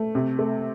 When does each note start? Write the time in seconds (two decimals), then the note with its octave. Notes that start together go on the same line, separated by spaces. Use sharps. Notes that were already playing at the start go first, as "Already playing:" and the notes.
Already playing: A3
0.15 C3
0.39 A3